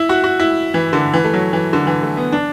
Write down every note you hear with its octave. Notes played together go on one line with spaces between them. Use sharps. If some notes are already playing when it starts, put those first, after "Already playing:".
Already playing: E4
F#4
F#4
E4
E3
D3
E3
A3
F#3
E3
D3
E3
A3
B3
D4